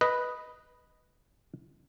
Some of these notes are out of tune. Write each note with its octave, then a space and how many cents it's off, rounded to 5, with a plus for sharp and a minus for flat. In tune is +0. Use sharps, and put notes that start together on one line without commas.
B4 +0 D#5 +0